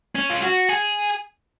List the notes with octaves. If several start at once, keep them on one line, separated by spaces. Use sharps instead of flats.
C#4
F4
F#4
G#4